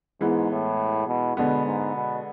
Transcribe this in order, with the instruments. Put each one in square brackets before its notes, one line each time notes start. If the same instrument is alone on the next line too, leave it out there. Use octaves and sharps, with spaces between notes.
[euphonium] G#2 [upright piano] E3 G#3 B3
[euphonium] A2
B2
[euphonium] B2 [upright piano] D3 G#3 B3
[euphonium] G#2
B2